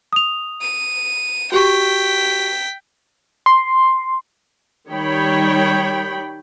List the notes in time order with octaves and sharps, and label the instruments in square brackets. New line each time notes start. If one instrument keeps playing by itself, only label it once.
[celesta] D#6 F7
[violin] D#7
[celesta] F#4 G4 C#6 [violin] G5 B6
[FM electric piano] C6
[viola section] D#3 G3 C#5 G5 B5